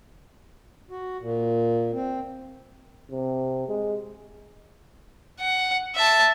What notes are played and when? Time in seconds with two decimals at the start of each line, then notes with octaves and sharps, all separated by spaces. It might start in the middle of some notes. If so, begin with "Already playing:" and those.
0.91 F#4
1.21 A#2
1.93 C4
3.11 C3
3.68 G#3
5.40 F#5
5.95 E5 A5